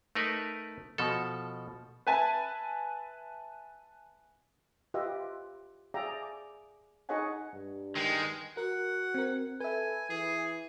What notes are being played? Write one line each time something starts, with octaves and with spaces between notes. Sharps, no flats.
A3 D#4 A#4 B4
B2 F3 A4
B4 E5 G#5 A5
F4 G4 B4 D#5 E5
G#4 D5 E5 F5 G5 A#5
D6
D#4 G#4 C#5 D#5 F#5 G#5
G2
D#3 G#3
F#4 A#4 F#5
C4 A#4
A4 B4 E5 G#5
E3 G#4